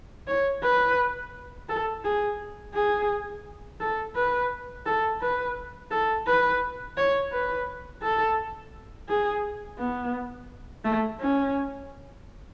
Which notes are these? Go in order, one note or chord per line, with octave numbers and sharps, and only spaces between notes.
C#5
B4
A4
G#4
G#4
A4
B4
A4
B4
A4
B4
C#5
B4
A4
G#4
B3
A3
C#4